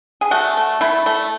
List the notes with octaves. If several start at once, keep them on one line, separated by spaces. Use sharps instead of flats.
G#4
A3 F#4
A3
A3 E4
A3